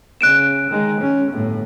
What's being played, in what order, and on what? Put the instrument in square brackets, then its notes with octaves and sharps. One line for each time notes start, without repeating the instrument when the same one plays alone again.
[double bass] C#3 [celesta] F#6 D7 E7
[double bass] D#3 G#3
C#4
G1 A2